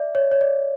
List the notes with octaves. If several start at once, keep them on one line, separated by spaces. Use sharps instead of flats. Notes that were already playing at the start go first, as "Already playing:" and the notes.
Already playing: D5 E5
C#5
C#5
D5